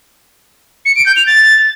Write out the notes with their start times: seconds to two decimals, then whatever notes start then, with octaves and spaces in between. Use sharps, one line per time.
0.85 C#7
0.96 D7
1.06 G6
1.16 F7
1.27 A6